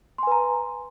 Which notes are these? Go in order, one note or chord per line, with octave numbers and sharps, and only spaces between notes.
B4 G#5 A#5 C6